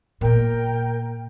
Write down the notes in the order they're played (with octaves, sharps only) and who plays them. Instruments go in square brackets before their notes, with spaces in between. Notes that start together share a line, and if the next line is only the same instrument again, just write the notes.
[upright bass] A#2 B3 [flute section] A#4 G5